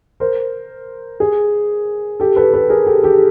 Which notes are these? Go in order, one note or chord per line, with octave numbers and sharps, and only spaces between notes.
A#4 C5
G#4
G4 A4
A4 B4
A4 B4
G#4 A#4
G4 A4
G4 A4